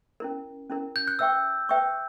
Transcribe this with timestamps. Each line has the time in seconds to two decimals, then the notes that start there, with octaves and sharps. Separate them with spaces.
0.20 C#4 E4 A#4
0.70 C#4 E4 A#4
0.96 G6
1.08 F#6
1.19 B4 E5 G5 C#6 E6
1.69 B4 E5 G5 C#6